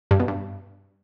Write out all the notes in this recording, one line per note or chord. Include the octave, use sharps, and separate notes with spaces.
G2
B2
G2